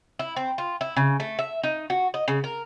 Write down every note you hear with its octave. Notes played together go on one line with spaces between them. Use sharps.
E4
C4
F4
E4
C#3
A3
E5
D#4
F#4
D#5
C#3
A#4